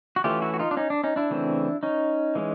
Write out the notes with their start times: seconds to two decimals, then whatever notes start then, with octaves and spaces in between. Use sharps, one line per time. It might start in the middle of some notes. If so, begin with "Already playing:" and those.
0.16 F#4
0.24 E3 A3 C#4 F4 G4
0.42 E4 F#4
0.54 F#4
0.59 D#4 F4
0.71 D4
0.77 C#4 D#4
0.90 D4
1.04 C#4 D#4
1.16 D4 E4
1.30 C#3 E3 A3 C4
1.83 C#4 D#4
2.35 E3 G#3 C#4